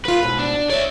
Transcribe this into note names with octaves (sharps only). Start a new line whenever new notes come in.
A#3 F4 B4
G#2 B2
D4
C#5 D5 E5